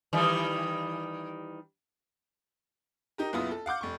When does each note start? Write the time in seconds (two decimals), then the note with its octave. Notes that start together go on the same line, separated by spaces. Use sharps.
0.13 D#3 E3 G3
3.18 D#4 G4 A#4
3.33 F#1 B1 B3 E4 F4 D#6
3.51 A4
3.66 F5 F#5 D6 G6
3.81 F1 C#6